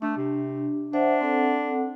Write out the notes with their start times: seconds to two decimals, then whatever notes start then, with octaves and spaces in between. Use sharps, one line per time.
0.02 A3 D4
0.17 C3
0.93 D4 C5 E5 F#5
1.21 C4 A4 F#5